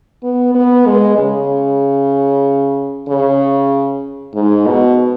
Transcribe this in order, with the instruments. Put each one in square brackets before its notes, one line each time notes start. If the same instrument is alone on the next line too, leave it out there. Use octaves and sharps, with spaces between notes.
[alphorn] B3
B3
G#3
C#3
C#3
G#2
B2